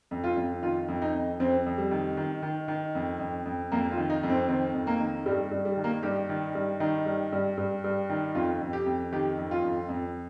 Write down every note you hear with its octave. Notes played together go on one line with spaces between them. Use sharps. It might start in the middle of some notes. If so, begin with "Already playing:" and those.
F2
F4
F2
D#3 F4
F2
D#4
F2
F2 C4
F2
G3
D#3
D#3
D#3
D#3
F2
F2
F2
F2 A#3
F4
D#3
D#4
F2
C4
D#3 C4
F2
A#3
D#3
G2 G3
G2
G3
D#3
A#3
G2 G4
D#3
G2
D#3 D#4
G2
G2
G2
G2
D#3
F2 F4
F2
G4
F2
D#3 G4
F2
F4
F2
F2